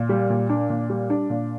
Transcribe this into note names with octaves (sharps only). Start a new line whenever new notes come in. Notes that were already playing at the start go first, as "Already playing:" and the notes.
Already playing: A#2
G3
A#2
D4
A#2
G3
D4
A#2